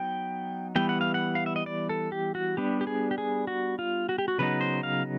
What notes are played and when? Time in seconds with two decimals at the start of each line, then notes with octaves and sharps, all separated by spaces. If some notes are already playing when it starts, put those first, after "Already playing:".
Already playing: F#3 B3 D#4 G5
0.76 E3 G3 B3 G5
0.89 F#5
1.01 F5
1.14 F#5
1.35 F5
1.46 E5
1.56 D#5
1.66 D5
1.89 A4
2.12 G4
2.35 F#4
2.57 G3 B3 D4 G4
2.81 G4
2.87 G#4
3.11 G4
3.18 G#4
3.47 F#4
3.79 F4
4.09 F#4
4.18 G4
4.28 F#4
4.39 C#3 F#3 B3 D#4 B4
4.61 C5
4.83 F5